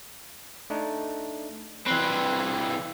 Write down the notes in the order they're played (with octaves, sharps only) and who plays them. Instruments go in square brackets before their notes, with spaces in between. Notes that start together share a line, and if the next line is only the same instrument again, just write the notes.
[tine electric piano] A3 D4 D#4
[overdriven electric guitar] E3 C4 [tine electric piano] B4 C6 F#6